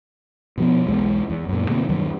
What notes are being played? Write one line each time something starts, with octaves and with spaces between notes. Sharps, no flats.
B2 F3 B3
B1 E2 G#3
E2
F#2 A#2
B2 D3 A#3 C4
E2 G2 D#3 F#3